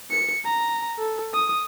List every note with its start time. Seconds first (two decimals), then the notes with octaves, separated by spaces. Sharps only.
0.11 C#7
0.45 A#5
0.99 A4
1.34 D#6